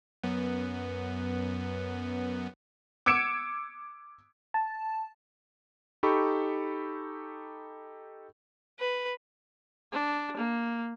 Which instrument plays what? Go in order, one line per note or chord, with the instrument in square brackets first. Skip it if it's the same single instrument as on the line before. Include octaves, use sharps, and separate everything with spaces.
[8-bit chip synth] F#2 B3
[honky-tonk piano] D6 E6 G#6 C#7 D7 E7
[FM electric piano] A5
[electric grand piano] D#4 G4 A4 B5 C#6
[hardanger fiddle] B4
[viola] D4
A#3